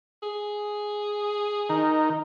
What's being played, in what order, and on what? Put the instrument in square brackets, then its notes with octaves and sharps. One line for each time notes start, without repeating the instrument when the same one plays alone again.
[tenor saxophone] G#4
[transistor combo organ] D#3 D#4